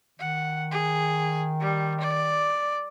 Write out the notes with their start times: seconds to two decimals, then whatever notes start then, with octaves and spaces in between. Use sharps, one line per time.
0.20 D#3 F#5
0.72 G#4
1.61 G3
2.01 D5